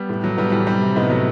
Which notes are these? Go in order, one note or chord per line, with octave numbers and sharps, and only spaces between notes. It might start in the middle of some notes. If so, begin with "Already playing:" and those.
Already playing: G3 B3
A2
F#3
A2 G3 B3
E3 G3
C3 G3
C3
A2 B3 D#4
F#3